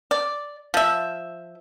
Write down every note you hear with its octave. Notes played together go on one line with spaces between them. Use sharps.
D5
F3 E5